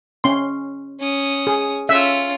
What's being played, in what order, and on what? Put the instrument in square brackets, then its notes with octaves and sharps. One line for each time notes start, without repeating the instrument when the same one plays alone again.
[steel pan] C#4 C6
[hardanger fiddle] C#4 D#6
[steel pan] G#4
[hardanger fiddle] C#4 F4 [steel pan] E5